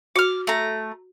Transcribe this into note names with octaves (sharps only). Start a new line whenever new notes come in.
F#4 D6 F6
A3 A#5